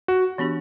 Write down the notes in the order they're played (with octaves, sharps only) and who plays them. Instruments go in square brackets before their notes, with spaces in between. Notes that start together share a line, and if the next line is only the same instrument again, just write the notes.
[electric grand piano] F#4
[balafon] E3 B3 D4 G4